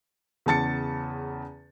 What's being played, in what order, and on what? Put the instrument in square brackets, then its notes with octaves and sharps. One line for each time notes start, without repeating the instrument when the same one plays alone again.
[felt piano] E2 C#3 A5 A6 C#7